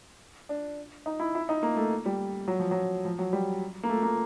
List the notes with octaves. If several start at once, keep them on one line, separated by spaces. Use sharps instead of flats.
D4
D#4
E4
E4
D#4
A#3
A3
G3
F#3
F3
F#3
F3
F#3
G3
A#3
A3
A#3